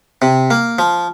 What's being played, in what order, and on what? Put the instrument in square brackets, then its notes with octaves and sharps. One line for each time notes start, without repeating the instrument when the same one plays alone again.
[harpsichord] C3
A#3
F3